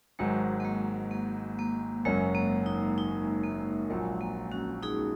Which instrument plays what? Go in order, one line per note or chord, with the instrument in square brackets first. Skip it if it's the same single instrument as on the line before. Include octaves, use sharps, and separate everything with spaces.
[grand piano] G#1 G#2 F#3 [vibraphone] G#3
[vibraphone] A#3
G#3
A#3
A#3
[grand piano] F#1 F#2 F#3 C#4 F#4 [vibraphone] G#3
[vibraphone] A#3
D#4
D#4
A#3
[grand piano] A#1 A#2 F#3 [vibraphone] G#3
[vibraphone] A#3
C#4 F#4
D#4 G#4